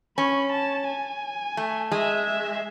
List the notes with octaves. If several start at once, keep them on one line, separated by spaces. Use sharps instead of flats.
C#4 B5
A5
G#5
A3
G#3 E5
E5